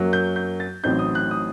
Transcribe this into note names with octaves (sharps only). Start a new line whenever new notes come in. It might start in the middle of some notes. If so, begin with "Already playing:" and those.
Already playing: F#2 F#3 A#3
G6
G6
A6
A1 A2 F#3 C4 D#4 G6
D#6
F#6
D#6